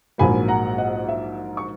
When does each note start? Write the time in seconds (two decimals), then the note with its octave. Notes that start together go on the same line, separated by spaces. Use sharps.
0.18 A#1 G#2 F#3 A#3 G#5 B5
0.48 F#5 A#5
0.78 D#5 F#5
1.09 E5
1.57 C#6